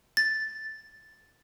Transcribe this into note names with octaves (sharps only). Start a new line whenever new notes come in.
A6